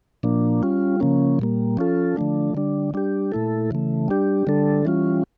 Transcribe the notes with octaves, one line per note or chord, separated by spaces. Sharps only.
A#2 F3 A#3 D4
G3 C#4 F4
C#3 F3 A#3 C#4
A#2 G3 A#3
F3 C#4 F4 A4
D3 F3 A3 D4
D3 G3 D4
G3 D4 G4
A#2 A3 E4 A4
C#3 E3 A3
G3 D4 G4
D3 G3 D4 A4
E3 G3 C#4 F4